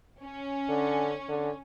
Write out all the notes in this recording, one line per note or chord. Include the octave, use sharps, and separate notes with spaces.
C#4
D3
D3